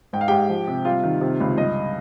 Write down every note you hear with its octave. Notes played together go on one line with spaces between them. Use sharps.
G#2 G5
F5
G#2 G4 G5
F3
C3
G3 F4 F5
D#3
C3
C#2
G2 D#5